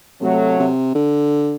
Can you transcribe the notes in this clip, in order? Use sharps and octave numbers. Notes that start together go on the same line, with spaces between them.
C3 F#3 A3
C3
D3